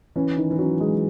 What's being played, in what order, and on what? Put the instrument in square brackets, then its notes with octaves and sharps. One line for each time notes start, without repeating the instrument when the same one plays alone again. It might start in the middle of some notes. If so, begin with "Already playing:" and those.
[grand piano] E3 [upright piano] C#4
[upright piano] D#3
[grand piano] E3
[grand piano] F#3 [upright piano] C#4
[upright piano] G#3